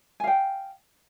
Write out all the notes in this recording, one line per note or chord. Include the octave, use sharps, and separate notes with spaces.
F5 G5 G#5